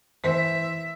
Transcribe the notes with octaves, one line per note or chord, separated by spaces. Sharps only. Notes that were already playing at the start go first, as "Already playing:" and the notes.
E3 C5 E5 B6